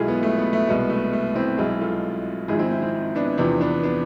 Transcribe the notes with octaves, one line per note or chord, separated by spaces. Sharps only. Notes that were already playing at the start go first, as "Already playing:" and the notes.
Already playing: B1 B2 G#3 E4 F4 G#4 A4
B3
A3
B3
A3
C2 B2 G#3 B3
A3
A3
C4 E4
B1 B2 G#3 E4 G#4
F4 A4
G#1 G#2 F3 E4 G#4
C4 E4
C4 E4
C4 E4
B3 D4
E2 C3 F3 B3 D4
B3 D4
B3 D4